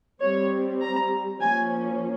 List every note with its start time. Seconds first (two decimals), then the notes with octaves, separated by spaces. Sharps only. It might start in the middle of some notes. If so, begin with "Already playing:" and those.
0.22 G3 C4 C#5
0.82 A#5
1.40 F3 A#3 C#4 G#5